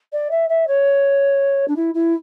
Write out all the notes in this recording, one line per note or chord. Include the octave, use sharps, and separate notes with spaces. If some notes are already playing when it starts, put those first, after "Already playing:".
D5
E5
E5
C#5
D4
E4
E4